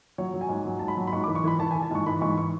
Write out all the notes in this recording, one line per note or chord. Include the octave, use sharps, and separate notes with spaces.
F#3 C#5
F#3
G#5
G#2
F#3
G#2 A5
B5
F#3
B5
G#2 C#6
D6
E3
C#6
E3 B5
E3 A5
G#5
E3
A5
G#2 C#6
E3 B5
G#2 C#6
C#6